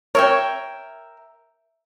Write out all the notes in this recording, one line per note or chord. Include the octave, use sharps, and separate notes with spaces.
A#4 C#5 E5 G5